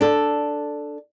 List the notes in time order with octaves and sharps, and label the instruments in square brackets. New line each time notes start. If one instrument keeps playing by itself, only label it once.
[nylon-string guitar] D4 A4